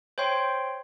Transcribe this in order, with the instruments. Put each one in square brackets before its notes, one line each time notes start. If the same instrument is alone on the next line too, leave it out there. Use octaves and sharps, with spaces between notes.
[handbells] C5 C#5 G5 C6